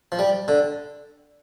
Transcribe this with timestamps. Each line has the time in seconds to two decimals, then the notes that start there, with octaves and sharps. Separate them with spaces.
0.12 F3
0.19 G3
0.48 D3